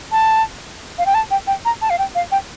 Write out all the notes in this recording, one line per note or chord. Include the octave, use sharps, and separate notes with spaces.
A5
F5
G5
A5
G5
G5
A#5
A5
F5
G5
F5
G5